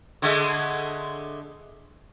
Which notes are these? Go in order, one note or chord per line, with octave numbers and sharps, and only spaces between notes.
D3 G#3 A3